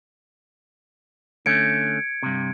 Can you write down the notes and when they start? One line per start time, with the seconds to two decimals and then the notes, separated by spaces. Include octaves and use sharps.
1.46 D3 A3 C#4 G#6 C#7 D7
2.23 G2 C3